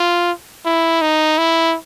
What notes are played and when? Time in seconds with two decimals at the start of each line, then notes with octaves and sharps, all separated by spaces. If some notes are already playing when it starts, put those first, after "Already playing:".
Already playing: F4
0.65 E4
1.01 D#4
1.38 E4